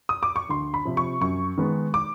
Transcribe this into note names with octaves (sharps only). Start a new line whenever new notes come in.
D#6
D6
C#6
D2 C6
B5
C3 F3
C#6
F#2 C#6
D#3 G#3 B3
D6